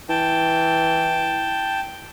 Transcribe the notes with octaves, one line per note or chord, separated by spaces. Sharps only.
E3 G5 A5